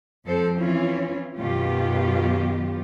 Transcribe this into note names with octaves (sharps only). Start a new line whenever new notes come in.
F2 F3 C4 A4 C5
E3 C4 C#4 E4 F4
F#2 B2 D#3 B3 F4 G4